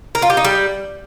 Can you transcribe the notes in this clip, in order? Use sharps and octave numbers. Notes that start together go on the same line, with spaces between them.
A#4
F4
G4
D#4
G3